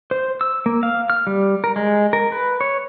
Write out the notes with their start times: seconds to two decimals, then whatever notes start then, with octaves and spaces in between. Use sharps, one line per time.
0.11 C5
0.41 E6
0.66 A#3
0.83 F5
1.10 F6
1.27 G3
1.64 A#4
1.76 G#3
2.13 A#4
2.32 B4
2.61 C#5